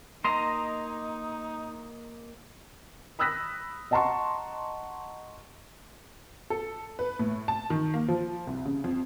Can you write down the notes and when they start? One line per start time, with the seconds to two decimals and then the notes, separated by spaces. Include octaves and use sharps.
0.24 A#3 D#4 D#5 A#5 C6
3.19 B5 D#6 E6 F#6 A#6 B6
3.91 D#5 F#5 A5 A#5 C6 C#6
6.50 A4
6.99 B4
7.19 A2
7.48 A5
7.70 D#3
7.94 A#3
8.08 F3
8.47 C2
8.66 C#3
8.84 F2